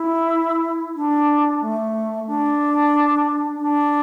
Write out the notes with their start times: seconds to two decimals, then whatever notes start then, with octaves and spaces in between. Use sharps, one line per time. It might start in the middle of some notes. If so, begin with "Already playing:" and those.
Already playing: E4
0.96 D4
1.61 A3
2.27 D4
3.57 D4